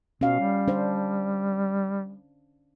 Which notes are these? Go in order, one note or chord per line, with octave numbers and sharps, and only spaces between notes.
B2 C#4 F5
G3
D4 C5